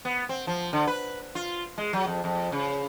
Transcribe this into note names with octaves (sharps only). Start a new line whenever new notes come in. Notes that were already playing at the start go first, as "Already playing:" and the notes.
B3
C4
F3
D3
B4
F4
G#3
F#3
F2
F2
C#3